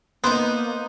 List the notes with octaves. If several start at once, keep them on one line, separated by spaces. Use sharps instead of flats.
A#3 B3 D#4 C5